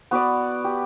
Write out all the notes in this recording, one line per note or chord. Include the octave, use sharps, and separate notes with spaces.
B3 F#4 B4 D5
G4